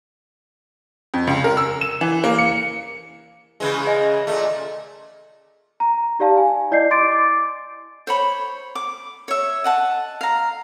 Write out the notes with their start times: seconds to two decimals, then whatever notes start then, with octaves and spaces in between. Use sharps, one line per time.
1.14 F2
1.27 C#2
1.44 A#4
1.57 E6
1.81 E7
2.01 E3
2.24 A#3
2.38 C#7
3.60 C#3 E3 G#3
3.87 D#5
4.27 A#2 A3
5.80 A#5
6.19 D#4 G4 D5 F5 A5
6.38 G#5
6.71 E4 D5 D#5 G6 C7
6.91 C6 D6 A6 D7
7.12 D6
8.07 C5 C#5 B5
8.75 D6
9.28 C#5 E5
9.64 D#5 F#5 A5
10.21 F5 A#5